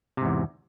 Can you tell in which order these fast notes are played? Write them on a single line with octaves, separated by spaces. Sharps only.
C3 G#2 E2